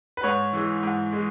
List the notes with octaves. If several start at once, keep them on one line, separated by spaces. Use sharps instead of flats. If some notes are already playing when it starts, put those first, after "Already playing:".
B4
G#2 C#5
E3 G#3
G#2
E3 G#3